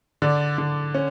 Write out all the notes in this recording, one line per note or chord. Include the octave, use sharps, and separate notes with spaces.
D3 D5
D3
C#4